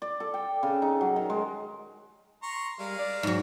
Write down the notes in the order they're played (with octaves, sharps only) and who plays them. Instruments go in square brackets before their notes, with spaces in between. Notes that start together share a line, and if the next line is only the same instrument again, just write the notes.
[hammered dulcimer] D5
A4
G5
C#3
D#4
F#3
D#3
G#3
[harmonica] A#5 C6 C#6
[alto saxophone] G3 [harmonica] G#3 A#4 F5
[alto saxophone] D5
[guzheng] G#2 F#3